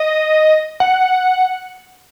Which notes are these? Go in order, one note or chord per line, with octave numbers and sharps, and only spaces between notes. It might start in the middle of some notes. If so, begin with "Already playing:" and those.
Already playing: D#5
F#5